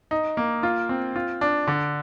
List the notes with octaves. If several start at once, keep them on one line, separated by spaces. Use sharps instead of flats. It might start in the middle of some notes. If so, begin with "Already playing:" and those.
D#4
A#3
F4
C4
F4
D4
D3